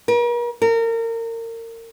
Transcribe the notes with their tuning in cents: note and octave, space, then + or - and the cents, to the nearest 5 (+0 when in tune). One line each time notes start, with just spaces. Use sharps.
A#4 +45
A#4 -30